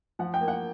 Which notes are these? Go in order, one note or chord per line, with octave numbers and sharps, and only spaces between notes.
F3 F#5
G5
A#3
F#5